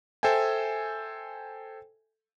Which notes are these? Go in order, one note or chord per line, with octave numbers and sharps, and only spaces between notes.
A4 C5 E5 G5 G#5